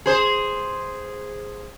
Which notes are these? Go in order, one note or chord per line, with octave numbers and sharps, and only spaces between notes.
G#4 C5